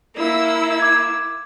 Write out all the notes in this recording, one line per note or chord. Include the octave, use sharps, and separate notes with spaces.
A#3 E4 E6
D6 G#6